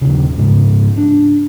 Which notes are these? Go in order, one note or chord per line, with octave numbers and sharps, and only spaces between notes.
D#1 C#3
G#2 C#3
D4